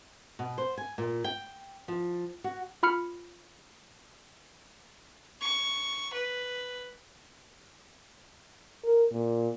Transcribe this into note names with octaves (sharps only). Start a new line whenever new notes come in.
B2
C5
G#5
A#2
G5
F3
F#4
F4 B5 F6 C#7
C#6
B4
A#4
A#2